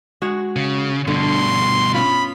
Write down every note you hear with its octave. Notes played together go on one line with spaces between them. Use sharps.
G#3 F#4
C#3
G2 B2 D3 C6
B3 C#4 F4 B5